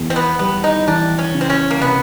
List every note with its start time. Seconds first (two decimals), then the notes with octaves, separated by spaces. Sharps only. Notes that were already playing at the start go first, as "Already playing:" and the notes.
Already playing: E2
0.10 C4
0.16 B3
0.39 G3 B3
0.64 D#4
0.87 E3 D4
1.19 C#4
1.34 C#3
1.41 C4
1.50 C#4
1.71 A#3
1.82 C3 B3